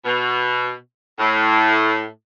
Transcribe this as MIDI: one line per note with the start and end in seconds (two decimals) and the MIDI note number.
0.05 0.74 47
1.19 2.04 45